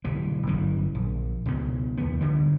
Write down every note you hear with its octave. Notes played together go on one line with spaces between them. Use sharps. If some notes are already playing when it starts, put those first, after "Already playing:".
D1 B1 E3 G3
G1 F#2 E3
A#1
C#2 B2
D#2 B3
D3 G3 G#3